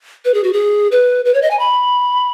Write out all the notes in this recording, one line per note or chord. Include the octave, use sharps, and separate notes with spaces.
B4
G#4
F#4
G#4
B4
B4
C#5
D#5
G#5
B5